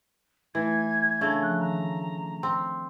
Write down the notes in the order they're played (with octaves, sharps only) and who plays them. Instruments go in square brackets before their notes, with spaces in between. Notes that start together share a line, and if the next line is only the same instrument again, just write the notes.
[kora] E3 [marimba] A3 E4 B4 [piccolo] G#6
[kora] C#3 A3 [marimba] D4
[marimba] F3 [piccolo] F#6
[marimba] D#3 [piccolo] A#5
[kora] C4